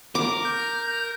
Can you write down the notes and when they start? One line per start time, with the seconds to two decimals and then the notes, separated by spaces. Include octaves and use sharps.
0.15 A#4 D6
0.45 G6